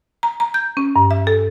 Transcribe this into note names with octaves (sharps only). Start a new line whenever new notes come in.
A#5
A#5
G6
C#4
G2
E5
A4